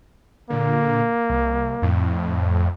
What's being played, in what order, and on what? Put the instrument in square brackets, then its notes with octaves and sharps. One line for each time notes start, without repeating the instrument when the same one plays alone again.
[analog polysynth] A#2 D3 [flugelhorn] A#3
[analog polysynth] C2
F2 A2